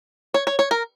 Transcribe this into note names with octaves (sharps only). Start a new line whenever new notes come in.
C#5
C#5
C#5
A#4